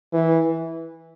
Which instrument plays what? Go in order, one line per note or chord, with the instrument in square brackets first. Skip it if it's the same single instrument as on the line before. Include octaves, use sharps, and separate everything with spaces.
[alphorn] E3